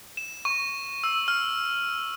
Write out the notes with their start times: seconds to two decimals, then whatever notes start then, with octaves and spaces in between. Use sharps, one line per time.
0.17 E7
0.45 C#6
1.04 E6
1.28 F6